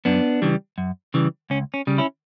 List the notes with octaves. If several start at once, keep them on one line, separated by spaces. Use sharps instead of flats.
F#2 B3 D4
C#3 E3 G3
F#2
C#3 E3 G3
C#2 C#4
C#4
C#3 G3
C#4 E4